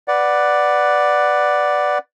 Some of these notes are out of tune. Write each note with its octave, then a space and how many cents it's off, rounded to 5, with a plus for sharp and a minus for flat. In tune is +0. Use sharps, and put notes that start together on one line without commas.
B4 +0 D5 +0 F#5 +0